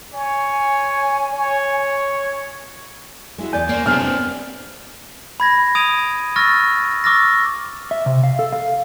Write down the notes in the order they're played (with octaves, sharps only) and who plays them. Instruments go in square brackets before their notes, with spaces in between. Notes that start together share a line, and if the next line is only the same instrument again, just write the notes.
[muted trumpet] C#5 [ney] G#5
[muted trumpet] C#5
[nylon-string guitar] G#3 E4 F#4
[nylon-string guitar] E2 D5 [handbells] G#5 G6
[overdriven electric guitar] A#3 [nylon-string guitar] C#4 C5
[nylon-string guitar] C3 G#3 B3 [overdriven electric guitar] C4 D4 [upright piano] F6
[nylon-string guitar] B3
[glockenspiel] B5 G#6 A#6
D#6 G#6 D7 D#7 F7
C#6 E6 F6 A6 A#6
C#6 D6 E6 F6 A6 A#6
[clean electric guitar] E5
C3
F5
A4
F5